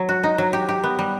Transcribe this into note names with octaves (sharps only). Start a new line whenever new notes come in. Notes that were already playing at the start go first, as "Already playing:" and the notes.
Already playing: F#3
F#4
D#4
F#3
G4
G4
B3
G3